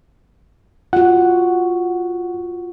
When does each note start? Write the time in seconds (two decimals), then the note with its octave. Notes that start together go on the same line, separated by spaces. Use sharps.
0.93 F4 F#4 F#5